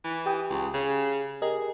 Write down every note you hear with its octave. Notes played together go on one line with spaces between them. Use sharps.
E3
G4 G5 D#6
C#2
C#3
G4 G#4 A#4 D#5